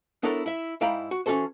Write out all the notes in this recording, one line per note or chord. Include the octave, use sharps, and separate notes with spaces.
B3 D4 E4 A4 A#4 C#5
E4 E5
G#2 E4 F5 G5 A#5 B5
F#4
E3 C#4 D4 F#4 A4 C5